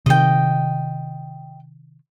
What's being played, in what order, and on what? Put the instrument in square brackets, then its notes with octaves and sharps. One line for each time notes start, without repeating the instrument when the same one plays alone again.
[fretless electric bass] C3 D#3 [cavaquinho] D#5 G5